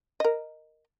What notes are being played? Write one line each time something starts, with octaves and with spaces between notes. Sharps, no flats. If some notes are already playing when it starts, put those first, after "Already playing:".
A#4 D#5